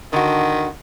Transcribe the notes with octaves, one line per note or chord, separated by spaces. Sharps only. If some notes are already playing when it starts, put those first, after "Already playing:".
D3 D#3 F#4